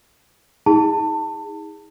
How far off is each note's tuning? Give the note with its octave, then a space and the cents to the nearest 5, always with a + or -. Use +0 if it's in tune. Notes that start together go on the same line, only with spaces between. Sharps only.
D#4 +45 G#4 -20 A5 +25